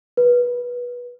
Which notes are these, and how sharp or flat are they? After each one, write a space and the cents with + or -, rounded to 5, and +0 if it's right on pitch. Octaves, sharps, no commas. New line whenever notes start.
B4 -20